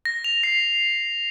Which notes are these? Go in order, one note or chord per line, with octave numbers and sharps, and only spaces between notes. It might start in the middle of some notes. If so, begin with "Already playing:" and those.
A#6
F7
C7